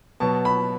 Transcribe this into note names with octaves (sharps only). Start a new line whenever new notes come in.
B2 F#3 B3 A5
B5